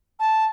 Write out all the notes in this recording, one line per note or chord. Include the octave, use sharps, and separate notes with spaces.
A5